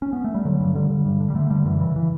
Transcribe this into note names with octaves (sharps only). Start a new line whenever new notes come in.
C#4
B3
A3
G3
D3 F#3
G2
D3 G3
D3
G2
D3
G3
D3 A3
D3 G3
F#2 E3
C#3 E3
E3